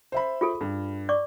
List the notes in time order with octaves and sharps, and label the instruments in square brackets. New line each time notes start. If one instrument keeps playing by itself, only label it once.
[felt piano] C5 E5 B5
[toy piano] F4 G#4 A4
[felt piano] G2
[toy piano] D5 C#6 D6